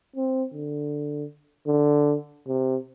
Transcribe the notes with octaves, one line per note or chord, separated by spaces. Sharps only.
C4
D3
D3
C3